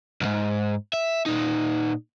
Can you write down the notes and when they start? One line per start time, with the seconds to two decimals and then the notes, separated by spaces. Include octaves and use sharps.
0.21 B1 G#2
0.93 E5
1.26 A#2 D#4